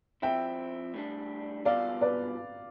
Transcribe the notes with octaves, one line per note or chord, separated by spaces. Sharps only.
F3 C4 E4 E5 G5
A2 G3 D4
B2 G3 B3 F4 A4 D5 F5
B4 D5